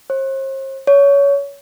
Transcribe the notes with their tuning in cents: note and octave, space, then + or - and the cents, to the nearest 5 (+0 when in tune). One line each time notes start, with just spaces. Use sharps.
C5 +40
C#5 +20